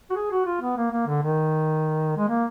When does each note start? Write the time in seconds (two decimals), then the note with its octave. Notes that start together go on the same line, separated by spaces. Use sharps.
0.10 F#4
0.15 G#4
0.31 F#4
0.45 F4
0.61 B3
0.77 A#3
0.91 A#3
1.07 D3
1.22 D#3
2.17 G#3
2.28 A#3